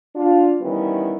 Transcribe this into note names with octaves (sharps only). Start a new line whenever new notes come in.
D4 F4
D#3 E3 G3 B3 C#4 E4